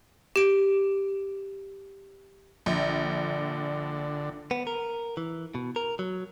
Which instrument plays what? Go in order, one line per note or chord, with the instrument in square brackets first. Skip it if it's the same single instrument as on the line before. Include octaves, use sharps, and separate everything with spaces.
[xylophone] G4 D7
[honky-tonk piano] A#1 [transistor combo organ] D3
[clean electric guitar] B3
A#4
E3
B2
A#4
F#3